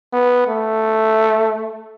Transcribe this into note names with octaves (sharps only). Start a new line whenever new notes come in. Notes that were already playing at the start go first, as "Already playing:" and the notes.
B3
A3